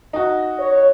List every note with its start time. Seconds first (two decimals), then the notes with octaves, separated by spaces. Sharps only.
0.13 D#4 F#4
0.60 C#5